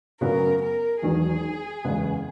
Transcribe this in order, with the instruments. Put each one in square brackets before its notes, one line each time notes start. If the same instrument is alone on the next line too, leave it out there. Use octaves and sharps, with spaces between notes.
[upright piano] F#2 C#3 F#3 B3 [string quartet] A#4
[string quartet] A#4
[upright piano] E1 E2 D#3 F#3 [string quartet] G#4
[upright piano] F#1 E2 C#3 G#3 B3